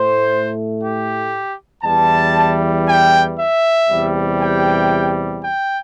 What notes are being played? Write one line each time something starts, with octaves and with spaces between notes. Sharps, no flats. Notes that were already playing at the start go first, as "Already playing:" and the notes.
Already playing: A2 A3 C5
G4
E2 E3 G3 A5
G5
E5
E2 C3 G3
G5
G5